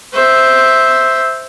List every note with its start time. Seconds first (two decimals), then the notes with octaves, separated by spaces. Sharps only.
0.13 C5 E5